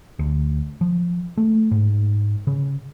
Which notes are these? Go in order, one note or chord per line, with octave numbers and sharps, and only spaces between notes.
D2
F3
A3
G#2
C#3